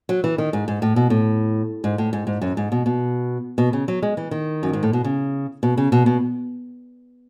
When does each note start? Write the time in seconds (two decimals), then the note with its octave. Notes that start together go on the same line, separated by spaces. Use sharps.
0.09 F#3
0.24 E3
0.38 D#3
0.53 G#2
0.68 G#2
0.82 A2
0.96 B2
1.10 A2
1.84 G#2
1.98 A2
2.13 G#2
2.27 G#2
2.41 F#2
2.57 G#2
2.72 B2
2.86 B2
3.58 B2
3.73 C#3
3.88 F#3
4.02 G#3
4.17 E3
4.31 D#3
4.63 F#2
4.73 G#2
4.83 A2
4.93 B2
5.04 C#3
5.63 B2
5.77 C#3
5.92 B2
6.06 B2